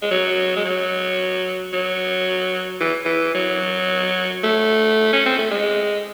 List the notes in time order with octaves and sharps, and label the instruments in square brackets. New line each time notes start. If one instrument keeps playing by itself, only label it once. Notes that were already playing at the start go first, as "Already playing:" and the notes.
[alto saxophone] G#3
F#3
G#3
F#3
F#3
E3
E3
F#3
A3
C#4
C4
A3
G#3